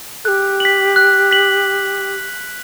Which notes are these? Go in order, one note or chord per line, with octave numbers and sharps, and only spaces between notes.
G4 A4 F#6
B6 F#7
F#6
B6 F#7